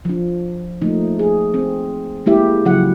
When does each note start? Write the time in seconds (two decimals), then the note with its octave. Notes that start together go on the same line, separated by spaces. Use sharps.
0.05 F3 D4
0.81 F3 A3 A#3 D#4
1.19 G#4
1.54 C4
2.26 G#3 A#3 E4 G4 E5
2.65 C#3 F3 F#3 E4 F#4 F#5